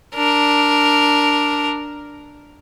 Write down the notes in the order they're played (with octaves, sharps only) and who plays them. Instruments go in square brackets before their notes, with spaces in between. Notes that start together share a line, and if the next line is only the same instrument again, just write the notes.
[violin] D4 A#4